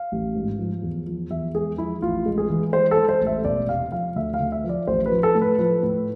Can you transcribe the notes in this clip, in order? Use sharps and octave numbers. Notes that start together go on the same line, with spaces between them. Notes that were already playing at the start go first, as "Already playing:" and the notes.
Already playing: F5
A1
G#2
F3
E2
F3
E2 E5
G#3 G#4
F3 E4
A1 F4
G#3
G#4
E3
G#3 C5
A4
G#3
C5
A1
E5
E1 D5
C3 F5
F3 F5
D2 E5
F5
D2
E5
F3
D5
A1 C5
B4
F3
A4
A2
B4
F3 B4
A2